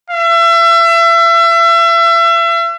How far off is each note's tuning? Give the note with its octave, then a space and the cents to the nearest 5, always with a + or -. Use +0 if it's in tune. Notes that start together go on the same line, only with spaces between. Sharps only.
E5 +35